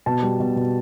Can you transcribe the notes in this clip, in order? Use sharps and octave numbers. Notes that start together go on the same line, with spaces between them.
B2 A5
G3
B2
B2